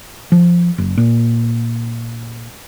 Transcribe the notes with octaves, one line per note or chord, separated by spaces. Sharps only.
F3
F#1
A#2